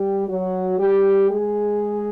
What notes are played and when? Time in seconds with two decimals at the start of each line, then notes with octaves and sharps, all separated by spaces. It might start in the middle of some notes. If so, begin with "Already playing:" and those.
Already playing: G3 G4
0.27 F#3 F#4
0.79 G3 G4
1.28 G#3 G#4